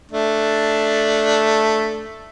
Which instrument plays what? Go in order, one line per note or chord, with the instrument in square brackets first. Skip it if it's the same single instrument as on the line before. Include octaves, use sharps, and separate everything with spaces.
[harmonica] A3 D4